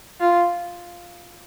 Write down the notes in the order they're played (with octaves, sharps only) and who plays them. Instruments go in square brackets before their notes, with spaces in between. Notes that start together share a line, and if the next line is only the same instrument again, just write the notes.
[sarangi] F4